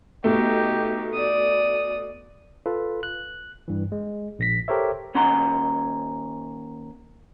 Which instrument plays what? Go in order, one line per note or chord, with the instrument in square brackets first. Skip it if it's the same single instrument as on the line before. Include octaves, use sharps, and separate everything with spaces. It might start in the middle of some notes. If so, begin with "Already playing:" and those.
[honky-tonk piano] B2 A3 [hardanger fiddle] D#4 G4
[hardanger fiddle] D5 D#6
[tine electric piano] F4 A4 B4
F#6
G2 E3
G#3
A#1 A#6 B6
G4 A4 A#4 C5 C#5 E5
[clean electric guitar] D#2 C#4 F#5 A#5 C6